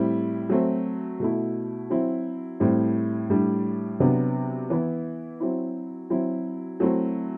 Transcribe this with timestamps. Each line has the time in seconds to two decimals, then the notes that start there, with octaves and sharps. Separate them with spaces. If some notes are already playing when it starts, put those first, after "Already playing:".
Already playing: A2 G3 C4 E4
0.50 F#3 A3 C4
1.20 B2 A3 E4
1.90 F#3 C4 E4
2.60 A2 G3 C4 E4
3.30 A2 G3 D4
4.00 C3 F#3 B3 D4
4.70 E3 B3 E4
5.40 F#3 C4 E4
6.10 F#3 C4 E4
6.80 F#3 A3 C4 E4